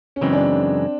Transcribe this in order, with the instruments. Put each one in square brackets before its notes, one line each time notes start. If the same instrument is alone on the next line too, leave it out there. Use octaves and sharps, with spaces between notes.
[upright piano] C#4
[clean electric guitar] F#2 C#3 E3 G#3 [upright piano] C4
[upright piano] D4